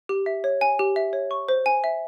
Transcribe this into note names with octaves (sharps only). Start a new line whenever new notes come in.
G4
E5
C#5
G#5
G4
E5
C#5
C#6
C5
G#5
E5